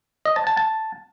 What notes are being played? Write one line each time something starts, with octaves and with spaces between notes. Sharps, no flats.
D#5
A5
A5
A5